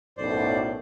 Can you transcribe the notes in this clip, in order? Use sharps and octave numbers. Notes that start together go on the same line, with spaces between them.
B1 F#2 A2 C5 D5